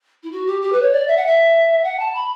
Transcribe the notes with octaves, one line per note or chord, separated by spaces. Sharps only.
E4
F#4
G4
G4
B4
C#5
D5
E5
F#5
E5
F#5
A5
B5